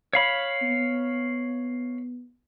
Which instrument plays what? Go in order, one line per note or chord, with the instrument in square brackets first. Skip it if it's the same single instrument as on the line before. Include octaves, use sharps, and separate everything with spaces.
[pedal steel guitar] C#5 F5 B5
[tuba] B3